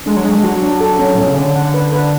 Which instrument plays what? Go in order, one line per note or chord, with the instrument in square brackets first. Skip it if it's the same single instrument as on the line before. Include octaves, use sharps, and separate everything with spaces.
[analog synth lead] G#3 [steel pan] D4
[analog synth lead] F#3
[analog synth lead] G#3 [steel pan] D4
[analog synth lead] G#3
[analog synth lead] F#3 [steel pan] F#4
[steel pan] D4
A4
C#4
[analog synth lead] A2
[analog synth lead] B2 [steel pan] C#4
[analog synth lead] C#3
[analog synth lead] D3 [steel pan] C#4
[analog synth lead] D3 [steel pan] F#5
[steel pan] B4
B4